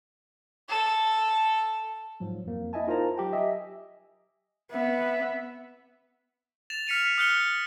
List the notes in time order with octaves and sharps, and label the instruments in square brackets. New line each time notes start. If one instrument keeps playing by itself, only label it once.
[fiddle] A4
[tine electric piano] G#2 F3 F#3
F2 A#3
E4 D#5 E5 G#5 A5
D#4 F4 A#4 C5 A5 A#5
F#3 G4 G5
D#5 E5 G#5
[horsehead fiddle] B3 [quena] E5
[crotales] A6 E7 F7
F6 B6 C#7 D#7 F7
D#6 F6 F#6 C#7 G7